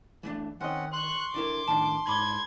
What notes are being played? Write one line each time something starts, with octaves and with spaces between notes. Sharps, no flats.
E3 A3 D4
D#3 C4 C#4 D#5 F#5
C6 C#6 F#6
D3 E4 A#4 D6
A2 D#3 D4 A5
G#2 B5 D6 G#6 G7